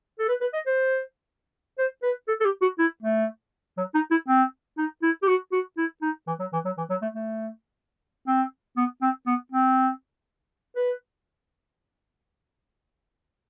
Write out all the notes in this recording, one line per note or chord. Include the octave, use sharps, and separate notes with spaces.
A4
B4
B4
D#5
C5
C5
B4
A4
A4
G4
F#4
E4
A3
F#3
D#4
E4
C4
D#4
E4
G4
F#4
F#4
E4
D#4
E3
F#3
E3
F#3
E3
F#3
A3
A3
C4
B3
C4
B3
C4
B4